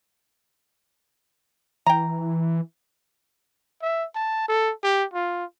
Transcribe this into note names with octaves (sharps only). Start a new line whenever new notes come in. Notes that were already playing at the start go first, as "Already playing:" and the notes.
E3 G5 A#5
E5
A5
A4
G4
F4